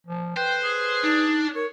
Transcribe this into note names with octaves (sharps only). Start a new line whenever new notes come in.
F3
B4 C5 G5
G#4
D4 D#4
A#4 C#5